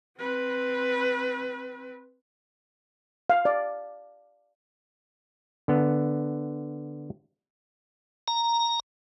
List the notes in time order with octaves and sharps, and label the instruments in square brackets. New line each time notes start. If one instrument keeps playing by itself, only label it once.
[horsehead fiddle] C4 B4
[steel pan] F5
D5
[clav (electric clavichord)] D3 B3
[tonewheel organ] A#5